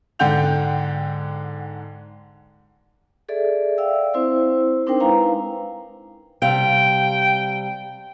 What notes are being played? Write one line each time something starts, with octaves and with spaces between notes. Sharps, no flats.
G#2 D3 F#5 G5 G6 F7
G#4 A4 D5 E5
D5 E5 F5 G5 E6
C4 E4 C5 E6
C4 D4 D#4 A#4 C5 G5
G#3 E4 B4 F5 A#5
C3 G3 F5 G5